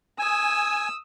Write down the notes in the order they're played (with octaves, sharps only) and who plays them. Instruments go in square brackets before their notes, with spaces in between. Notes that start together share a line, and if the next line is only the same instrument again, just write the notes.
[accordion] G#5 [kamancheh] D#6 E6